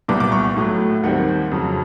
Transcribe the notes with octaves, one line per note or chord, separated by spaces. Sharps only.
C2 A#2 G3 B3 D6
D6
C#6
A2 F#3 A3
D#2 D#3 G3 C4 F#5
F2 C#3 F#3